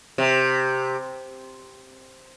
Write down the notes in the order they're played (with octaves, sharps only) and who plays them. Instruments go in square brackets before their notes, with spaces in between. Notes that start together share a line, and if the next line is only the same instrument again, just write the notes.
[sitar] C3